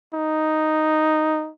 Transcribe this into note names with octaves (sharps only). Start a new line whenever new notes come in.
D#4